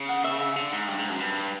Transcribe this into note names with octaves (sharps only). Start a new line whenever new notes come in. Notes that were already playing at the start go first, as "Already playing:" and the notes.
Already playing: C#3
F#5
E5
D3
G#2
G2
G#2
F#2
G2